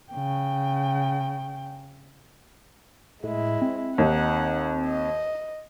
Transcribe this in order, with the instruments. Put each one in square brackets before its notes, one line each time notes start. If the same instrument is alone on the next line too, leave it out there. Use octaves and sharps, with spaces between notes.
[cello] C#3 G5
[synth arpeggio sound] A2 [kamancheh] G#3 E4
[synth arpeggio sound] C4
[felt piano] D#2 [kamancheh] D#4 F#5
[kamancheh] D#5